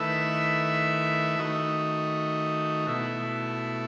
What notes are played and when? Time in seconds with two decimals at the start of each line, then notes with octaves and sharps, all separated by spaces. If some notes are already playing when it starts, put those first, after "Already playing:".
Already playing: D#3 A3 E4 B4 E5
1.39 D#3 A3 D#4 F#4
2.87 B2 A3 E4